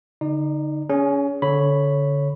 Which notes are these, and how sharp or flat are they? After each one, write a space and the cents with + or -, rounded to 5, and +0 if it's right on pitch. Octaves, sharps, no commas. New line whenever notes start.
D3 -25 D#4 -10 D5 +25
C#4 +25 G#4 -5
D3 -20 C#5 +0 B5 +0